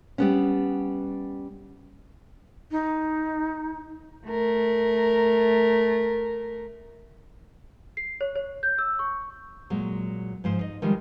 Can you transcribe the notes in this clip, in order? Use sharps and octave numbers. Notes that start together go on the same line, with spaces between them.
G3 B3 C#4
D#4
A3 A#4
C7
C#5
C#5
G6
E6
C#6
A#2 F#3 G#3
G#2 F3 C5
D#4 D#5
D#3 F3 G3 G#3